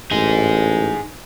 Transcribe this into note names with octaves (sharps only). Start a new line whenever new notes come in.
A1 D#4 G#4